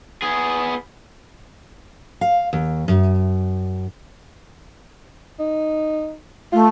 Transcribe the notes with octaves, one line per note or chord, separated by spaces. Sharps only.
B3 G#4
F5
D#2
F#2
D#4
A3 F4